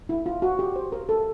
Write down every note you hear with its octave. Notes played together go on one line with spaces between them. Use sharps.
E4
F4
F#4
G4
C5
A#4
A4